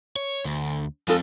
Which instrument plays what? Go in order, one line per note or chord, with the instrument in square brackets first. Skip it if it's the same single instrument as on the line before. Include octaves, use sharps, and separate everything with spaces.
[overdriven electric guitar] C#5
D2
[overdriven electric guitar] F3 C4 [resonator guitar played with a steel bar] G#3 F4 A4